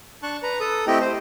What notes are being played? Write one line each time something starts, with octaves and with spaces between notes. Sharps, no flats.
D4 A5 C#6 F#6
B4 A#5
A4 D#6
A3 C4 E4 G4 D#5 G5
C5